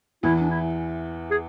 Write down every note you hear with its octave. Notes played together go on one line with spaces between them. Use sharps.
E2 E3 E4
D4
E4
G#4